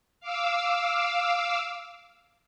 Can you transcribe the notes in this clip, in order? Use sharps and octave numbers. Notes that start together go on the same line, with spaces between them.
F5 D6 E6